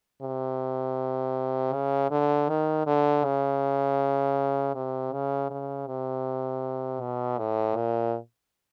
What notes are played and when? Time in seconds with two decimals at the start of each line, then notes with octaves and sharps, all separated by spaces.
0.22 C3
1.73 C#3
2.11 D3
2.49 D#3
2.86 D3
3.24 C#3
4.75 C3
5.13 C#3
5.50 C#3
5.87 C3
7.01 B2
7.38 A2
7.76 A#2